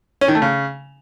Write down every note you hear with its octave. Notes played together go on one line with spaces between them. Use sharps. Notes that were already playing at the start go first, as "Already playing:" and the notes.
C#4
D#3
A3
C#3